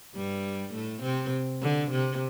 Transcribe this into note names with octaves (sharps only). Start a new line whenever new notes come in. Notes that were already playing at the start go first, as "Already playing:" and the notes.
G2 G3
A2 A3
C3 C4
D3
C3